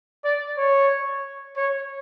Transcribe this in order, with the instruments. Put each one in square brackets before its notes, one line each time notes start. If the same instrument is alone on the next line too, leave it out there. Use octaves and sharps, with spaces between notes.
[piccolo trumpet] D5
C#5
C#5